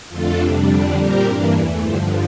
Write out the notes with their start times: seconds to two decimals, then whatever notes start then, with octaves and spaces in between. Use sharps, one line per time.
0.08 F2 D3 A3 D4 F4 A4
0.38 F2 C3 G3 D4
0.66 F2 D3 G3 D4
0.95 A#2 G3 C4 G4 A#4
1.23 G2 E3 A#3 D4
1.52 E2 E3 A3
1.81 G2 D3 F3 A4 C5